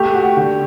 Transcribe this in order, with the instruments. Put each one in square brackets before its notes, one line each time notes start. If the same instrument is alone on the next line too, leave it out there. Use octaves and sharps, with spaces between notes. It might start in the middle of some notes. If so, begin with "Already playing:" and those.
Already playing: [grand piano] A3 [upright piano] G4
[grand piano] F#4
D3